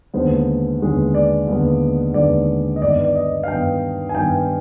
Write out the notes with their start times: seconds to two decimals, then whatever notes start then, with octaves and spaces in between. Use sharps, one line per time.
0.14 D#2 D3 G#3 B3 C5
0.80 D#2 D3 G#3 B3
1.15 D5
1.47 D#2 D3 G#3 B3
2.14 D#2 D3 G#3 B3 D5
2.76 D#5
2.82 G2 D#3 B3 D5
3.05 D5
3.15 D#5
3.44 F5
3.48 G2 D#3 B3 G5
4.09 G#5
4.15 G2 D#3 B3 G5